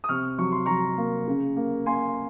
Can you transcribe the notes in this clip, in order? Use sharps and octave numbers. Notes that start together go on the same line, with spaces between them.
D#6
C3 C#6 F6
F#3 C#6
C6
F#3 A#5 C#6
A#3
C#3
A#3
A#3 G#5 C6